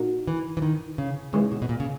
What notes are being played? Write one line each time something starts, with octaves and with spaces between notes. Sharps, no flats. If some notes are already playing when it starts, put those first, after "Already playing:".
Already playing: A#2 A#3 D#4 F#4
E3
E3
D#3
C#3
G#2 C#3 E3 G#3 C#4
B2
B2
A#2
C#3